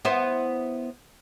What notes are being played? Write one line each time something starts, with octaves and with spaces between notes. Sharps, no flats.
B3 E4 C5